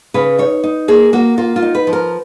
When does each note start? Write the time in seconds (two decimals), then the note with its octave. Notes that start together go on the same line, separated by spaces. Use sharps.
0.14 C#3 B4
0.39 D#4 C#5
0.64 D#4
0.88 A#3 G#4
1.13 A#3 F#4
1.38 A#3 F4
1.56 F4
1.62 D#4
1.75 B4
1.87 F3
1.93 A#4